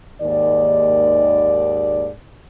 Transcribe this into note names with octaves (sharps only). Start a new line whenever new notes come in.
D#2 G#2 D5